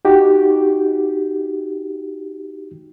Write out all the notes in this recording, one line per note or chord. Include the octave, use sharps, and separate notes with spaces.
D#4 F#4 G4